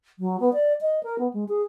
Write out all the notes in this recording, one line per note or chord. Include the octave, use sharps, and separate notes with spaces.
F#3
B3
D5
D#5
A#4
B3
G#3
G#4